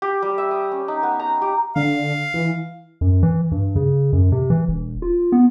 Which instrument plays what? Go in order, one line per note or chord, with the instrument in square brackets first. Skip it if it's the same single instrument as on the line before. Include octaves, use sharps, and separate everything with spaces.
[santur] G4
G3
E5
D#6
C#4
D#4
B3
A#5
G4
[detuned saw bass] D3 [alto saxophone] F5
[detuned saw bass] E3
[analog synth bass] F#2
E3
G2
C#3
F#2
C3
E3
E1
F4
B3